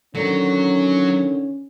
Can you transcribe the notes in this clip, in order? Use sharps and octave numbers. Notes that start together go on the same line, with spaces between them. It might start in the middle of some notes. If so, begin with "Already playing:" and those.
D3 D#3 F#3 C#4